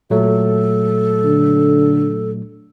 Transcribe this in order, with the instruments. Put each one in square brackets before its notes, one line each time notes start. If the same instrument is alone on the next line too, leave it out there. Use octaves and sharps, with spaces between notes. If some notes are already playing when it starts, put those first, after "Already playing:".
[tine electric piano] A#2 F#3 A3 [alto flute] A4
[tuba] D3